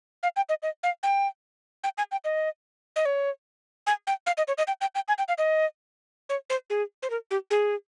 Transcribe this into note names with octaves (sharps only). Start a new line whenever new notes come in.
F5
G5
D#5
D#5
F5
G5
G5
G#5
G5
D#5
D#5
C#5
G#5
G5
F5
D#5
C#5
D#5
G5
G5
G5
G#5
G5
F5
D#5
C#5
C5
G#4
C5
A#4
G4
G#4